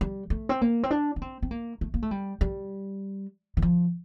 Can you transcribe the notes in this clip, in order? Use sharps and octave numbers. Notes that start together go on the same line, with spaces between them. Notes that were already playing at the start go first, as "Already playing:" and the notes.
G3
A3
C4
A#3
C4
D4
D4
C4
C4
A#3
A3
A#3
A3
G3
G3
E3
F3